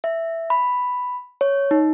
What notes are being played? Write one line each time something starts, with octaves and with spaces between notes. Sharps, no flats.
E5
B5
C#5
D#4